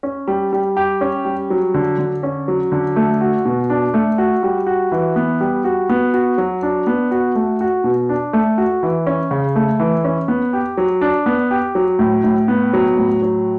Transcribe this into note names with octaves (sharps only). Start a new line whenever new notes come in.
C#4
G3
G3
G4
C#4
G3
F#3
D3
D3
C#4
F#3
D3
A3
F#4
B2
D4
A3
F#4
G3
F#4
E3
B3
G3
F#4
B3
F#4
F#3
D4
B3
F#4
A3
F#4
B2
D4
A3
F#4
E3
C#4
C#3
A3
E3
C#4
B3
G4
F#3
D4
B3
G4
F#3
A2
A2
B3
F#3
A2
F#3